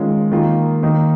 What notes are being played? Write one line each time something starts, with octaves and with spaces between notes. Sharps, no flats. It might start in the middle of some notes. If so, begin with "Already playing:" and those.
Already playing: D#3 G#3 C#4 F4
D#3 A#3 F4
D#3 A#3 D#4